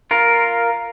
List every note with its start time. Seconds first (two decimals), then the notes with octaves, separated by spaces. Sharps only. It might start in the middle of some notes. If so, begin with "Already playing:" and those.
0.11 F4 A#4